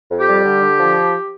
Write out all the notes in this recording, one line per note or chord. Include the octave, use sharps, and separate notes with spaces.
F2
G4
G3
D3
D3
F3